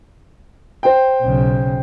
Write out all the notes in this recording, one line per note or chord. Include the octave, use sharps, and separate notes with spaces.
C5 G5
B1 C#3